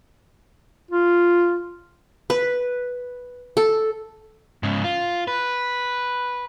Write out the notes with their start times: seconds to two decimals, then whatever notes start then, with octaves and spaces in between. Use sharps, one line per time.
0.91 F4
2.30 B4
3.57 A4
4.63 G#2 C#3
4.84 F4
5.28 B4